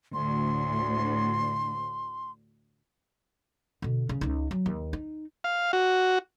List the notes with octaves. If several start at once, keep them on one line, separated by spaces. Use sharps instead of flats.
D2 A2 C6
B2 D3
C#3
C#2 D#4
F#3
D#2
D#4
F5
F#4